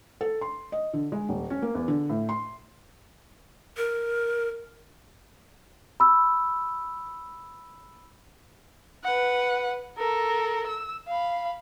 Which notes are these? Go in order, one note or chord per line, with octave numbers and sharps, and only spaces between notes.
A4
C6
D#5
D3
G#3
D#1
C#4
A#3
E2
D3
A2
C6
A#4
B5 E6
B4 F#5
A4 A#4
E6
F5 B5